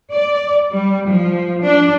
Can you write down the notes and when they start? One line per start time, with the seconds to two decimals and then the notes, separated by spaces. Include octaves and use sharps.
0.12 D5
0.73 G3
1.07 F3
1.64 D4